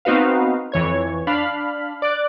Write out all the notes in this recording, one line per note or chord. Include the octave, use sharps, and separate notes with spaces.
B3 C4 D#4 F#4 B4 F5
F2 E3 C#5 G#6
D4 F5 B5 F6
D5 D6 F#6